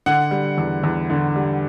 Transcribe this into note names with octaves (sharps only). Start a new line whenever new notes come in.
D3 F#5
G3
E2
E2
D3
G3